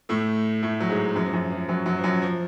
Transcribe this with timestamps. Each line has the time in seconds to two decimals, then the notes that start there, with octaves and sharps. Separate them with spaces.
0.09 A2 A3
0.62 A2 A3
0.80 F#3
0.90 G#2 G#3
1.15 F#2 F#3
1.25 F3
1.33 F#2 F#3
1.51 F3
1.69 F#2 F#3
1.86 F#2 F#3
1.98 F3
2.04 F#2 F#3
2.22 F3